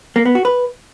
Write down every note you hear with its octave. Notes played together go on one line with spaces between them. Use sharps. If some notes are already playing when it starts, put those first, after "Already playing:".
A#3
B3
F#4
B4